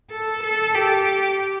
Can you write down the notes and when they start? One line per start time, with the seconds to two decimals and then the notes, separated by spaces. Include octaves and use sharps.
0.11 A4
0.43 A4
0.74 G4